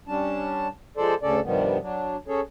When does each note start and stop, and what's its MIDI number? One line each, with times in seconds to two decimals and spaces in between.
0.08 0.68 55
0.08 0.68 61
0.08 0.68 62
0.08 0.68 81
0.97 1.14 53
0.97 1.14 56
0.97 1.14 69
0.97 1.14 72
0.97 1.14 74
1.23 1.40 38
1.23 1.40 49
1.23 1.40 61
1.23 1.40 69
1.23 1.40 74
1.44 1.78 43
1.44 1.78 48
1.44 1.78 51
1.44 1.78 53
1.44 1.78 55
1.44 1.78 59
1.82 2.16 54
1.82 2.16 62
2.28 2.41 61
2.28 2.41 68
2.28 2.41 69
2.28 2.41 73